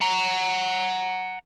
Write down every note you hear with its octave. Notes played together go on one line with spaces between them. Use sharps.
F#5 A#5